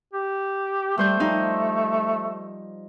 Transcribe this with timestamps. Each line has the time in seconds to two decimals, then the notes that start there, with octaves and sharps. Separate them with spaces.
0.13 G4
0.98 G3 A3 C5 G6
1.20 F3 G3 D#4